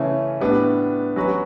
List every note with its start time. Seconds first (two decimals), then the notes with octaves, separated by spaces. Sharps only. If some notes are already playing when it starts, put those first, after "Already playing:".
Already playing: C#3 E3 A3 C#4 E4
0.40 A2 G3 B3 D4
1.16 F#3 C#4 F#4 B4